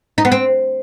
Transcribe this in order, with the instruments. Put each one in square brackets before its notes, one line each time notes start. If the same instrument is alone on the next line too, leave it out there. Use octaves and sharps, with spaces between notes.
[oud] D#4
B3
C4